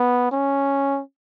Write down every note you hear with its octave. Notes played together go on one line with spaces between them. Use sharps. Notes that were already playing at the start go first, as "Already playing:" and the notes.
Already playing: B3
C#4